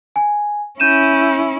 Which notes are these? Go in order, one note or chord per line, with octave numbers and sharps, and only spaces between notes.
G#5
C#4 E4 G6 D#7 E7